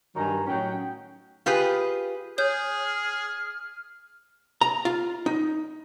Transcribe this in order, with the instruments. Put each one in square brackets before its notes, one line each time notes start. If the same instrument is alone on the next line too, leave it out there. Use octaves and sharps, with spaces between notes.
[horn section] G2 D#3 F#3 G#5 A#5
A2 F#3 C#4 D#4 G5
[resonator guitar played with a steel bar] F4 G4 G#4 B4
[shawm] G#4 [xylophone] C#5 G6 [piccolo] F6
[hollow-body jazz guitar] A#5
F4
D#4